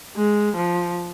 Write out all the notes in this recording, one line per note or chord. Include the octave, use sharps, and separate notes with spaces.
G#3
F3